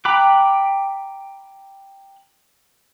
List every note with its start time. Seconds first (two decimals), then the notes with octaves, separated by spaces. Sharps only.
0.05 G5 A#5 B5 D6 F#6